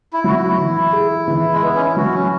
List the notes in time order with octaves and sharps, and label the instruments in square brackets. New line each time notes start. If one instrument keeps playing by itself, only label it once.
[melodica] E4
[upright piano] F#3 [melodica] F#4
[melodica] E4
[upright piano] E3
G#4
E3
[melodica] G#3
[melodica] B3 [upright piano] B4
[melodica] C#4
E4
[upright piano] F#3 [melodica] F#4
[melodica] C#4